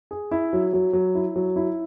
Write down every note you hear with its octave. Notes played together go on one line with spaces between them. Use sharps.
G#4
E4
F#3
F#3
F#3
E4
F#3
E4